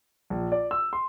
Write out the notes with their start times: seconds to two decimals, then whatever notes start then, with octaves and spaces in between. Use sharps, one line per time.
0.30 A#1
0.52 D5
0.71 E6
0.93 C6